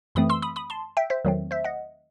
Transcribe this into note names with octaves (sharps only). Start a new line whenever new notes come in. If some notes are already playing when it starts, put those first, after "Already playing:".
F#2 E3 A3 C4 B5 D#6
C6 E6
B5 D#6
B5 D#6
A5 C6
E5 G5
C5 E5
E2 D#3 F#3 A3 C4
C5 E5
D#5 F#5